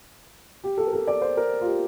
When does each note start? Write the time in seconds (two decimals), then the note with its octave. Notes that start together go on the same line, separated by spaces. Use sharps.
0.64 G4
0.77 A4
0.87 A#4
0.93 A4
1.07 D5
1.21 C5
1.37 A#4
1.61 F4
1.66 G4